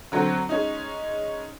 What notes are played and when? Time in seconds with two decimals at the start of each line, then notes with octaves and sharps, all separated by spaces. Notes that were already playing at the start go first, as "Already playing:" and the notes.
0.12 D3 F#3 C4
0.49 G#3 C#4 D#4